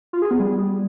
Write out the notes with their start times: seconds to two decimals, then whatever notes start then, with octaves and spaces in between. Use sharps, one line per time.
0.13 F4
0.22 G#4
0.31 B3
0.40 G3